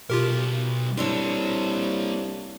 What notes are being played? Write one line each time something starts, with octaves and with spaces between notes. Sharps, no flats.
B1 F4 G4 A#4
C2 A#3 D4 A4 C5 C#5